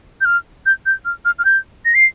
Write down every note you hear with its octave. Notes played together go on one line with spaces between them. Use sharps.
G6
F6
G6
G6
F6
F6
F6
G6
A#6
C7